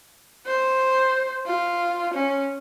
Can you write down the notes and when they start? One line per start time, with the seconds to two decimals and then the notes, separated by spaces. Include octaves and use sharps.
0.46 C5
1.46 F4
2.14 C#4